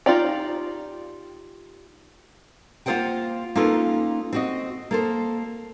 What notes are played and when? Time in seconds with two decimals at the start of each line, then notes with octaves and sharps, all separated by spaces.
0.06 D#4 F4 G4 D5 A#5
2.86 A#3 F4 A4 C5 F#5 G5
3.56 A#3 C#4 D#4 F4 A4 B4
4.33 C4 F#4 D#5
4.91 A#3 A4 C5